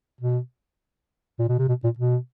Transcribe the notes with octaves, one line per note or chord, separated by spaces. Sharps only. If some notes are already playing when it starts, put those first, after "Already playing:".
B2
A#2
B2
C3
B2
A#2
B2